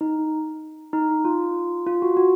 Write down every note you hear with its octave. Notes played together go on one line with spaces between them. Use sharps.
D#4
D#4
F4
F4
F#4
F#4